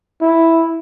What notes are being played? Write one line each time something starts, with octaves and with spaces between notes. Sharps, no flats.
E4